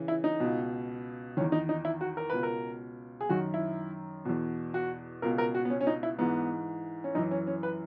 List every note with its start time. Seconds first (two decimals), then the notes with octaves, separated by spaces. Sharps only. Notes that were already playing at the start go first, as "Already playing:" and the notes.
Already playing: C#3 E3
0.08 E4
0.24 D#4
0.40 C#2 B2
1.37 D#3 C#4
1.41 E2
1.52 D#4
1.69 D#4
1.85 E4
2.01 F#4
2.17 A#4
2.30 C#2 B2 B4
2.43 A#4
3.21 G#4
3.29 F#2 D#3 F#4
3.54 E4
4.25 E2 B2
4.74 F#4
5.22 C#2 B2 A#4
5.38 A#4
5.55 F#4
5.65 B3
5.70 C#4
5.81 C#4
5.87 D#4
6.03 E4
6.19 G#2 E3 B3
7.04 C#4
7.15 F#2 D#4
7.18 E3
7.31 C#4
7.47 C#4
7.63 B4